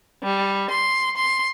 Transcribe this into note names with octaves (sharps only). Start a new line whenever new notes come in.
G3
C6
C6